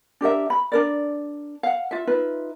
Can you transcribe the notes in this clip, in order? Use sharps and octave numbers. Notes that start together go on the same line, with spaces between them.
D4 G4 A#4 E5
B5
D4 A#4 D5
F5 F#5
F4 E5
D#4 F4 B4 E5